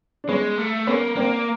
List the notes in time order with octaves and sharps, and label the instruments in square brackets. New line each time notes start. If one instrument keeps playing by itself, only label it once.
[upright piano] D4
[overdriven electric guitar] G#3 [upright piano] B3 C#4
[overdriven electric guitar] A3
[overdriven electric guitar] A#3 [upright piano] B3 C#4
[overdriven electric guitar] A#3 [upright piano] C4 D4